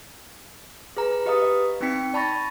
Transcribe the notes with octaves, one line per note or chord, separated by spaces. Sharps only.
G#4 B4 A#5
G4 B4 D#5 F5 A#5 D#6
D#5
B3 C4 D#4 G5 B6 C#7
D5 A5 B5 C#6 A6 A#6